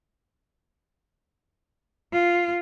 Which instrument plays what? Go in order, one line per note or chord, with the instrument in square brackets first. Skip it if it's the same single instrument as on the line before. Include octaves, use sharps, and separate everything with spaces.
[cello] F4